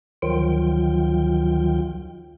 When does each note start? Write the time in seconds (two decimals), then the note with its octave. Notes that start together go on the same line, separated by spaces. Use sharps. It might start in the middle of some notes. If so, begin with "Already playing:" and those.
0.22 D2 D#3 F3 F#3 F4 G5